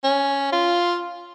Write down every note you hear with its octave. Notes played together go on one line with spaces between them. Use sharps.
C#4
F4